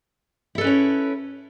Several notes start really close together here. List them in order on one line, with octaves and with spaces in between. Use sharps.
E4 A4 B4 C#4 C#5